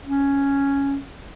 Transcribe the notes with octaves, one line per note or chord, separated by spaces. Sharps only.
C#4